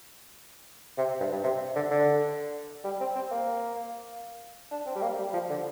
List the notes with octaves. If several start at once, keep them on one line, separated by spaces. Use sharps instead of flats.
C3
G2
G2
C3
D3
D3
G3
C4
C4
A#3
D4
C4
G3
A#3
G3
F3
D3